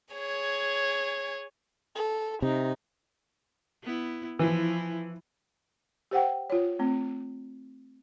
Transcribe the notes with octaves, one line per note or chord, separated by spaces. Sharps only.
G#4 C#5
A4
C3 D#4
B3 E4
E3 F3 E4
G4 C5 F#5 G5
F4 C#5
A3 C4